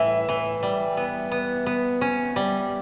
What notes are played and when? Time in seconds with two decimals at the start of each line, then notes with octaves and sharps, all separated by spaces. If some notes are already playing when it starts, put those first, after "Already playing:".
Already playing: A2 E3 E5
0.29 E3
0.63 G3
0.97 B3
1.32 B3
1.66 B3
2.01 C#4
2.36 G3